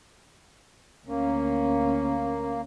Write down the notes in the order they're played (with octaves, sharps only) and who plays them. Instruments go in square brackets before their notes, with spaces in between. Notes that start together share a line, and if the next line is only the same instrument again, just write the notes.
[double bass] D2 C#4 [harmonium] A#3